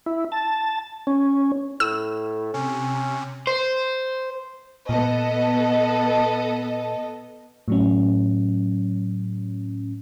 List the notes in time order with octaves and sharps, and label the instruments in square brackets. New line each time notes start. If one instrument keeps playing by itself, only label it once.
[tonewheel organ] E4
A5
C#4
[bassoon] A2 [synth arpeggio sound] E6
[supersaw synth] C3 [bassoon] C#4
[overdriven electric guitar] C5
[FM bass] A#2 [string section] B3 A4 D#5
[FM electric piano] A2 F#3 C#4